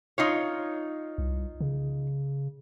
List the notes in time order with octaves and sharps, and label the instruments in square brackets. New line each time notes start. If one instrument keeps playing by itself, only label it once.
[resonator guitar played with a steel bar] D#4 F4 C#5
[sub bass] C2
C#3